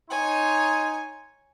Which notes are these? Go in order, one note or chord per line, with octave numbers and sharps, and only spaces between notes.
D#4 C#5 G#5 C6